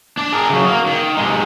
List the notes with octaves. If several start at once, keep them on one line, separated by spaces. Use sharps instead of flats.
D4
G#4 A#4
C#3 F#3
A#3
D#3
C3 G#3